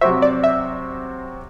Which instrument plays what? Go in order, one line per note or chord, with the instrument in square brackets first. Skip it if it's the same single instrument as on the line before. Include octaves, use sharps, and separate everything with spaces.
[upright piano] C3 F#3 C4 F#4 C5 [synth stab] E5
[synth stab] D5
E5